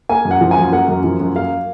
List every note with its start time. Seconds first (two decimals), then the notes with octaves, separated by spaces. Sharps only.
0.09 A#3 G#5
0.25 F#2
0.31 F#5
0.41 F3
0.51 G#5
0.57 F#2
0.72 A#3 F#5
0.88 F#2
1.04 F3
1.20 F#2
1.35 A#3 F5